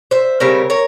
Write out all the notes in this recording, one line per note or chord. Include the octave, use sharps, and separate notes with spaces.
C5 E5
C#3 G3 C4 A#4 C#5
A#4 C#5